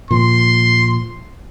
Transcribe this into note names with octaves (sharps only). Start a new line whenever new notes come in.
A#2 F3 C6